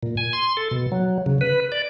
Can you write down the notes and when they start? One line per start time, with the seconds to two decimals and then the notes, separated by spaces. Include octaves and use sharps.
0.03 A#2
0.17 G#5
0.33 C6
0.57 A4
0.71 B2
0.92 F#3
1.26 C#3
1.41 B4
1.72 D5